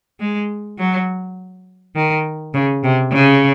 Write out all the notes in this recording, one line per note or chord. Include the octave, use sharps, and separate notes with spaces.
G#3
F#3
D#3
C#3
C3
C#3